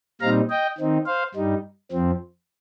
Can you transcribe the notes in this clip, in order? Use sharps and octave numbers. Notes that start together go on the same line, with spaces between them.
A#2 G3 C4 D#4 F5 A#5
D#5 G5
D#3 C4 D#4
C5 F5
G2 G3 D#4
F2 F3 C4